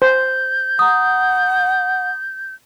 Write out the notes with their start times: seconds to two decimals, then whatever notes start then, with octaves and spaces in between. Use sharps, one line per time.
0.02 C5 G6
0.79 F#5 A#5 D#6